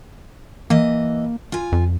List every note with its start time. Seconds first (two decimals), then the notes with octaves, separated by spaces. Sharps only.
0.70 E3 A#3 D#5
1.52 F4 G#5
1.72 F2